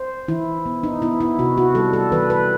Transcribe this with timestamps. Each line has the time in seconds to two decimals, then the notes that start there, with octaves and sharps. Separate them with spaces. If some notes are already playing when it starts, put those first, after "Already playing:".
Already playing: C5
0.28 E3 E4
0.66 B3
0.83 D#4
1.02 B3 E4
1.21 E4
1.39 C3 F#4
1.58 F#4
1.75 G3 A4
1.93 A4
2.12 E3 B4
2.30 B4